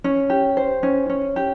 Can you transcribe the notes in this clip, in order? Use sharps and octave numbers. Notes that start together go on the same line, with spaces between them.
C#4
G4
C5
C#4
C#4
G4